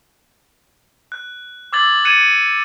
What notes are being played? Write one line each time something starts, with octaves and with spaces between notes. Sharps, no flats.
F#6
D6 E6 G#6 A6 F#7
F#6 G#6 A6 C#7 D#7 E7